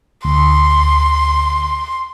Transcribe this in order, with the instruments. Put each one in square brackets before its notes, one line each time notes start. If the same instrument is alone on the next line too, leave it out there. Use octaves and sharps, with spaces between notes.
[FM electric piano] D2 [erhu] C6